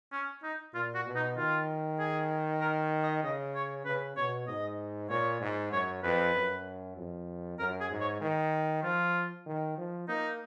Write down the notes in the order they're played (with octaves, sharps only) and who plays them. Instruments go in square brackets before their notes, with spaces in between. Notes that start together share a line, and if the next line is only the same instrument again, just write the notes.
[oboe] C#4
D#4
[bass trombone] A#2 [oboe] F4
[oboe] F#4
[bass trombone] B2
[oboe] D#4
[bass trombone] D#3 [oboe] F4
[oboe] G#4
A#4
D#5
[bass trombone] C#3 [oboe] D#5
[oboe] C#5
[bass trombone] C#3 [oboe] B4
[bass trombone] B2 [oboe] C#5
[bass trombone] G#2 [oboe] D#5
[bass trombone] A#2 [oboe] C#5
[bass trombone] G#2
[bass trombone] F#2 [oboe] C#5
[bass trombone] F2 [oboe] B4
[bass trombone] F#2
F2
[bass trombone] F#2 [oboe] A#4
[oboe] G#4
[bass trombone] G#2
[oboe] C#5
[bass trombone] D#3
[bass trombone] F3 [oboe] F4
[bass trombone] D#3
F3
[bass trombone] A#3 [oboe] D#4